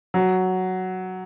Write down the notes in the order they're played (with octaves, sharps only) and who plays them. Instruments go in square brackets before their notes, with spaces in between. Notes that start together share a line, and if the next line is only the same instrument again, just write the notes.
[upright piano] F#3